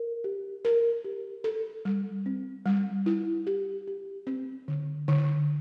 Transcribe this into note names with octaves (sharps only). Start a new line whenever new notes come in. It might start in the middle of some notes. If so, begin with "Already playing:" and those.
Already playing: A#4
G4
A#4
G4
A4
G3
C4
G3
E4
G4
G4
C4
D3
D3